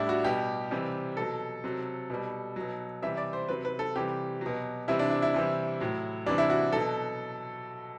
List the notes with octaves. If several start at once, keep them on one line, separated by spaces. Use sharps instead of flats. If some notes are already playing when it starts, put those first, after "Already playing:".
Already playing: A2 G3 D4 E4
F#4
B2 G3 G4
C3 E3 G3
B2 F#3 A4
C3 F#3
B2 G3
B2 F#3
C3 E3 G3 E5
D5
C5
C3 F#3 B4
B4
A4
C3 E3 G3 G4
B2 F#3
C3 E3 G3 E4
D4
E4
E4
C3 E3 G3
A2 F#3
C3 E3 G3 D4
E4
F#4
B2 F#3 A4